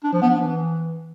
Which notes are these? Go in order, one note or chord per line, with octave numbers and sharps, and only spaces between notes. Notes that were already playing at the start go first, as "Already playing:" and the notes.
D4
F3
B3
D4
E3